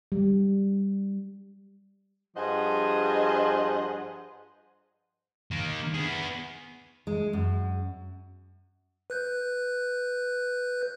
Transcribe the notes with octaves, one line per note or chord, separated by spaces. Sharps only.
G3
G2 F3 G#4 C5 D#5 F#5
D#3 A#3
B3 G#4
G#3
F#2
B4 F#6 G6